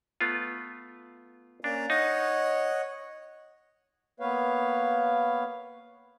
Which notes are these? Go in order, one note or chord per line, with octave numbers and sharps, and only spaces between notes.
A3 B3 F4
A#3 C#4 D4 A#5
D#4 C#5 D#5 F#5
A#3 B3 B4 C#5 F5